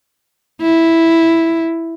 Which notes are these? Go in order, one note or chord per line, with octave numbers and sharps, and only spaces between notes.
E4